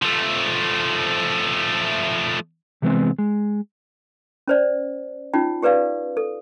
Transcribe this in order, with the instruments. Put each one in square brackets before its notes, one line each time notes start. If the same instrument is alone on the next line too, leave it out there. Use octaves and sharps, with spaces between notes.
[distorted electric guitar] F3 A3
[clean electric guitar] C3 E3 G#3 B3 C4
G#3
[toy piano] C#4 C5 D5
C#4 D#4 F4 G5
G4 G#4 B4 D5 F5
A4